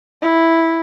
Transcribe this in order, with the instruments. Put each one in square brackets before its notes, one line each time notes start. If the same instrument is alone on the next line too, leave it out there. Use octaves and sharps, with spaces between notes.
[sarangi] E4